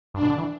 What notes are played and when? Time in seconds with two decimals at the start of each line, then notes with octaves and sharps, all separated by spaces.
0.14 G2 D4
0.22 B2
0.30 D3
0.38 E3